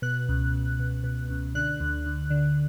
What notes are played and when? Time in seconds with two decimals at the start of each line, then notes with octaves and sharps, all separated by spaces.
0.02 B2 F#6
0.29 C#2
0.54 C#2
0.79 B2
1.04 B2
1.30 C#2
1.55 D3 F#6
1.80 D2
2.06 D2
2.30 D3